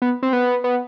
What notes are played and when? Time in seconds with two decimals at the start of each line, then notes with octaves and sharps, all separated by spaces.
0.02 B3
0.23 C4
0.33 B3
0.64 B3